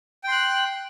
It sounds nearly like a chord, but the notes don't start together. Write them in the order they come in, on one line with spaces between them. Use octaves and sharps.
G5 C6 F#6